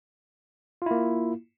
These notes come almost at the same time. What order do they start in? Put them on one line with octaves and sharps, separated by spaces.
F4 E4 A#3